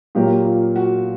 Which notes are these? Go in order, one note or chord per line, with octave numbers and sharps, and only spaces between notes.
A#2 F#3 A#3 G4
F4
F#4